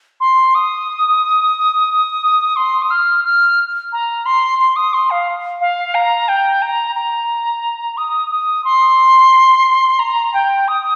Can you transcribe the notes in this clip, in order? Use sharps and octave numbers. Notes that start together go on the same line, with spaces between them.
C6
D#6
C6
D#6
F6
F6
A#5
C6
C6
D#6
C6
F5
F5
A#5
G5
A#5
A#5
D#6
D#6
C6
A#5
G5
D#6